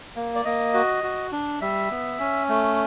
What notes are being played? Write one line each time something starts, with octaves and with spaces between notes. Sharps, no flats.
A#3
D5
A#3 D#5
F#4
F#4
D4
G3 E5
B3
C#4
A3